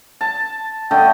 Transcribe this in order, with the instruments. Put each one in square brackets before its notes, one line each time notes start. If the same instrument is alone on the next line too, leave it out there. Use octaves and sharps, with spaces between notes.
[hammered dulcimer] A5
[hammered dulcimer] D3 A3 D#5 [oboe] G5